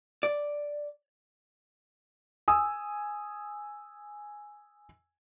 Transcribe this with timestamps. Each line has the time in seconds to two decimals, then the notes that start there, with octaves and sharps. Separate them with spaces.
0.23 D5
2.48 G#5 D#6 E6